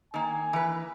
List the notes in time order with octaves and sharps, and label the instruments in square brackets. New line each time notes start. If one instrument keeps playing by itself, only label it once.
[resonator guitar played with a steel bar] D#3 A#3 [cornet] G#5
[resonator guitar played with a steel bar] E3 B4